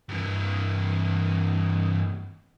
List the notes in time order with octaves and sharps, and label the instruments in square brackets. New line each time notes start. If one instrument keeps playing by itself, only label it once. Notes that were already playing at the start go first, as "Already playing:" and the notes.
[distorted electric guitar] G2 E3